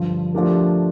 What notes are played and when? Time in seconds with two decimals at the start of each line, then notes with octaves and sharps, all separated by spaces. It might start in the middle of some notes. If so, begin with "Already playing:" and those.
Already playing: G2 D3 F3
0.34 F3 A3 D4 G4 A#4